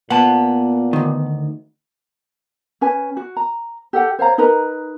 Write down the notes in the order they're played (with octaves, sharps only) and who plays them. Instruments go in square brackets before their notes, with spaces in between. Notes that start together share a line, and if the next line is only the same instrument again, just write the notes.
[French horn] A#2 [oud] B3 [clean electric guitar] F#5 A5
[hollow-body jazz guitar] D2 D#3
[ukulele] C#4 B4 G#5
F#4
A#5
G4 A4 F#5 G5
C5 C#5 F5 A#5
D#4 A#4 B4 A#5